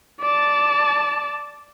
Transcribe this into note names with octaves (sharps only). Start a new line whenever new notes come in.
D5 A5